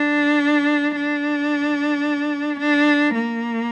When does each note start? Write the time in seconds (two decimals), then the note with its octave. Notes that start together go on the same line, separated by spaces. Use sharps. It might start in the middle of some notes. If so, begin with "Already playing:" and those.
Already playing: D4
0.96 D4
2.60 D4
3.14 A#3